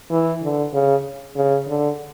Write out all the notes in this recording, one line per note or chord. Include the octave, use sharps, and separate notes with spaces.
E3
D3
C#3
C#3
D3